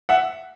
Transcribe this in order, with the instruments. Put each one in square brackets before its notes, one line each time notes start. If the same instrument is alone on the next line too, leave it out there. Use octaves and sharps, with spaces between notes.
[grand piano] E5 F#5